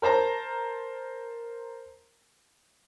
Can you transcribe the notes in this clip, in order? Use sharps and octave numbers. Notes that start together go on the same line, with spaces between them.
A#4 C5 A5 A#5